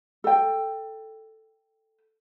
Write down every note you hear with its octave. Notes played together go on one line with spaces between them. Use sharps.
A4 G5